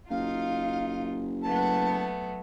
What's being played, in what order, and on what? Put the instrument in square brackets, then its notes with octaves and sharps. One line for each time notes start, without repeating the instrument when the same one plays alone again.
[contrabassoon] F#1 [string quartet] D#4 F4 [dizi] F5
[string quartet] F#3 A3 B3 [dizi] A5